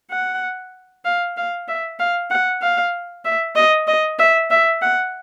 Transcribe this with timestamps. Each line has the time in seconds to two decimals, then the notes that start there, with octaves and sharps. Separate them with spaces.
0.11 F#5
1.05 F5
1.37 F5
1.68 E5
1.99 F5
2.30 F#5
2.62 F5
3.25 E5
3.56 D#5
3.87 D#5
4.19 E5
4.51 E5
4.82 F#5